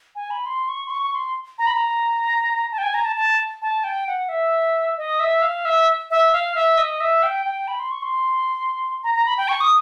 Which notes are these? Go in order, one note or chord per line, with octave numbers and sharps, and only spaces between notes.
G#5
B5
C6
C#6
C6
C#6
C#6
C6
A#5
B5
A#5
A5
G5
G#5
A#5
A5
A5
A5
G5
F#5
E5
D#5
E5
F5
E5
E5
F5
E5
D#5
E5
G5
G5
B5
C6
C#6
C6
A#5
A#5
B5
G5
C#6
D#6